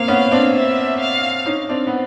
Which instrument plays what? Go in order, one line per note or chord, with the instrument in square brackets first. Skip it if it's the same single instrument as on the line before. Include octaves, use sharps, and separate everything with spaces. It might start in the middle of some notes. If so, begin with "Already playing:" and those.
Already playing: [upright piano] A#3 C4 [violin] F5
[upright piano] B3 C#4
C4 D4
[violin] E5
F5
[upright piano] C#4 D#4
C4 D4
B3